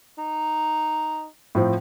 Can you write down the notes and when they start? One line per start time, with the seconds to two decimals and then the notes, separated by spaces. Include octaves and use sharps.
0.18 D#4
1.55 A2 F3 C4